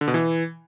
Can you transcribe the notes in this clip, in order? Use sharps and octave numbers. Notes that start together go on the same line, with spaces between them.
D3
B2
E3